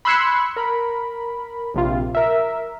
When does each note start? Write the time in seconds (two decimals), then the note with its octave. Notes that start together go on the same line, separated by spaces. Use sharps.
0.05 B5 C6 E6 F#6 G#6 C#7
0.56 A#4 B5
1.74 A#1 C3 F4
2.15 A#4 E5